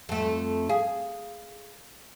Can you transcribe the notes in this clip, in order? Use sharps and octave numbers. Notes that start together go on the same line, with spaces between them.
F2 A3
G#4 F5